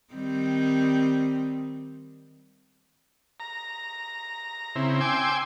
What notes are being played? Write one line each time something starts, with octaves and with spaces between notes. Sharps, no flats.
D#3 G3 C4
A#5
C#3 C4 E4
G5 G#5 C6 D6 E6